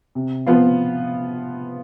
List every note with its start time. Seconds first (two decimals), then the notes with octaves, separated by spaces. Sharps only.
0.15 C3
0.47 F3 B3 F4